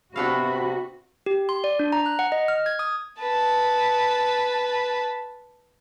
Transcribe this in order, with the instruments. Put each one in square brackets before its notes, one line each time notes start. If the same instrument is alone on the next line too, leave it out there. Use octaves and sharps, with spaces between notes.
[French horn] C3 [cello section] B3 F#4 [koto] D4 A4 F5 [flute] B5
[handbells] G4
C6
D5
D4
A#5
F#6
F#5
D#5
F6
G#6
D#6
[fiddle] B4 A5